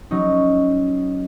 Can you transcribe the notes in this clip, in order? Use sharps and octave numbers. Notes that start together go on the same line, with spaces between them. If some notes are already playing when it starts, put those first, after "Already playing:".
F#3 C#4 D#4